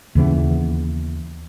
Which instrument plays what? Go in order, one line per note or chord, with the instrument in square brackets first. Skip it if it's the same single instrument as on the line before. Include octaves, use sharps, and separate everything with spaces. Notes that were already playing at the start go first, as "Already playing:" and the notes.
[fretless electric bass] D#2 C#3 E3 B3